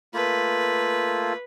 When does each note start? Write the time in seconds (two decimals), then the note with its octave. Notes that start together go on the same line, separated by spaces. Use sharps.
0.14 A3 A#3 F4 B4